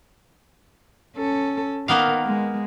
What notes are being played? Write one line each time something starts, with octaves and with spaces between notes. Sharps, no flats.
C#4 A4
D#3 A#3 B3 F5
G#3